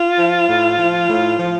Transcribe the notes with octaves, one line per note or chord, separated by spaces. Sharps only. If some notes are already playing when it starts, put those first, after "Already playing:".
Already playing: F4
F3
A2
F3
A2
F3